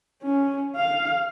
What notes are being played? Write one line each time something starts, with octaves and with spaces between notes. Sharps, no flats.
C#4
F5